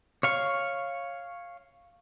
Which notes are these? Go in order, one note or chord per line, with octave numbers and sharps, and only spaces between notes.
C#5 F5 C#6